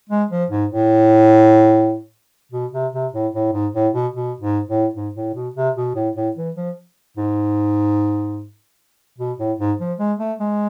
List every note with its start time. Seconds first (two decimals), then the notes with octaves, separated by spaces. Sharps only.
0.10 G#3
0.31 F3
0.51 G#2
0.71 A2
2.52 B2
2.73 C3
2.93 C3
3.13 A2
3.34 A2
3.53 G#2
3.74 A2
3.94 B2
4.14 B2
4.41 G#2
4.68 A2
4.95 G#2
5.15 A2
5.35 B2
5.56 C3
5.76 B2
5.95 A2
6.16 A2
6.36 E3
6.56 F3
7.17 G#2
9.18 B2
9.38 A2
9.59 G#2
9.79 F3
9.99 G#3
10.19 A3
10.40 G#3